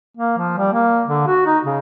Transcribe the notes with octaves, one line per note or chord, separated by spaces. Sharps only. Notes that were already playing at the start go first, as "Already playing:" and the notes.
A#3
F3
G3
A#3
D3
F#4
D#4
C#3